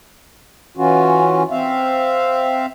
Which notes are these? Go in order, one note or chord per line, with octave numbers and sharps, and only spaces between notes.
E3 C#4 F4 F#4
C4 E5 F5